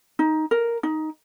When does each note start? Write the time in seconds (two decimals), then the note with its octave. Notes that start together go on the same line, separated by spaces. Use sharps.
0.19 D#4
0.51 A#4
0.83 D#4